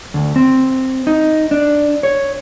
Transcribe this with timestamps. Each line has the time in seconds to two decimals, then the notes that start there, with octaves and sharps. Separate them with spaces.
0.14 D2
0.36 C4
1.07 D#4
1.51 D4
2.03 C#5